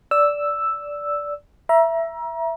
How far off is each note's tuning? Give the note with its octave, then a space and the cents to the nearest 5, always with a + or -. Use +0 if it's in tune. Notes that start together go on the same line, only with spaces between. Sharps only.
D5 -10 E6 +0
E5 +10 A#5 +30